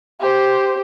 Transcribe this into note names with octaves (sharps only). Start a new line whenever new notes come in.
G4 C5